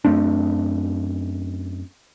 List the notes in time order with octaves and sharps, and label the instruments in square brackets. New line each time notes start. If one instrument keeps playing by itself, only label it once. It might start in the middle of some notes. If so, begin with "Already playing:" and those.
[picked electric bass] F#2 A3 C4 D4